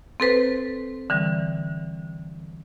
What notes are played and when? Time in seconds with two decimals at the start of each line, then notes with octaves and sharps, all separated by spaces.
0.20 C4 A4 B4 C5
1.10 D3 E3 G3